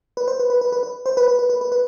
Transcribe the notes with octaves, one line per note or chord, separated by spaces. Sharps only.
B4
C5
B4
B4
B4
B4
B4
C5
B4
B4
B4
B4
B4
B4